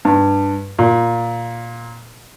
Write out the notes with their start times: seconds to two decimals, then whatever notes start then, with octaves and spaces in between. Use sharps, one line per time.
0.05 G2
0.79 A#2